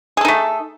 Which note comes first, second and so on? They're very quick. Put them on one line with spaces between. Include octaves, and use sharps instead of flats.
G#4 A4 D#4 A3